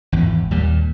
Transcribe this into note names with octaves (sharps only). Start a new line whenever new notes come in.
G#1 E2
D#2 A#2 G3